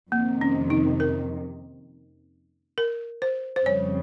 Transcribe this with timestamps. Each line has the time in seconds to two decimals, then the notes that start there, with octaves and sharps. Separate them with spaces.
0.12 F2 C3 D#3 A#3
0.41 C#4
0.70 D#4
1.00 A#4
2.78 A#4
3.22 C5
3.56 C5
3.66 F2 C#3 G3 C#5